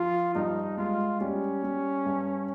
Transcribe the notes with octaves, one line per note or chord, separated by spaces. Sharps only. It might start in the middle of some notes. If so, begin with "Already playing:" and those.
Already playing: F3 F4
G2 D#4
G#3 F4
G3 C#4
G3
G2